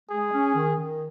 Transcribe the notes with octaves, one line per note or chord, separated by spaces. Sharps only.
G#3 G#4
C#4
D#3
D#3